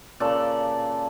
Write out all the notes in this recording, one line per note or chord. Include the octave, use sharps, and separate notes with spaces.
A#2 C#3 A4 D5